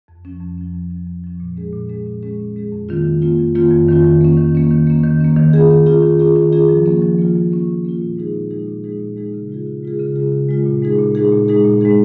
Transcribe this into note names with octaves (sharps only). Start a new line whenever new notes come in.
F2
F3 C#4
F2
F3 C#4
F2
F3 C#4
F2
F3 C#4
A#2
G#3 C#4 G#4
A#2
G#3 C#4 G#4
A#2
G#3 C#4 G#4
A#2
G#3 C#4 G#4
F2
D#3 A#3 C#4 F4
F2
D#3 A#3 C#4 F4
F2
D#3 A#3 C#4 F4
F2
D#3 A#3 C#4 F4
D#3
A#3 C#4
D#3
A#3 C#4
D#3
A#3 C#4
D#3
A#3 C#4
D#3
C#4 F4 G#4
D#3
C#4 F4 G#4
D#3
C#4 F4 G#4
D#3
C#4 F4 G#4
F3
A#3 C#4 F4
F3
A#3 C#4 F4
F3
A#3 C#4 F4
F3
A#3 C#4 F4
A#2
G#3 D#4 G#4
A#2
G#3 D#4 G#4
A#2
G#3 D#4 G#4
A#2
G#3 D#4 G#4
C#3
G#3 F4 G#4
C#3
G#3 F4 G#4
C#3
G#3 F4 G#4
C#3
G#3 F4 G#4
A#2
G#3 D#4 G#4
A#2
G#3 D#4 G#4
A#2
G#3 D#4 G#4
A#2
G#3 D#4 G#4